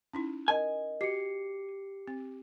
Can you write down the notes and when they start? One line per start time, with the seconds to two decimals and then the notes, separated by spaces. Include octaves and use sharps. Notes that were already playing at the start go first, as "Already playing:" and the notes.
0.13 C#4 D#4 E4
0.48 A#4 D#5 G#5
1.01 F#4 G4 D#5 C7 C#7
2.07 C4